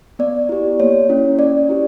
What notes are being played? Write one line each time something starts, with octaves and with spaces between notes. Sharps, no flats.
B3 D5
E4 G4
A#3 C#5
C#4 E4
C#4 D5
E4 G4